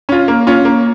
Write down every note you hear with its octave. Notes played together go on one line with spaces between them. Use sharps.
C#4 F4
A#3
C#4 F4
A#3